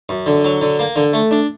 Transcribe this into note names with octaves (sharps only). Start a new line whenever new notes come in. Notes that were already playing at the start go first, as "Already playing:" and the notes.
F#2
D3
F#3
D3
A#3
D3
A3
D4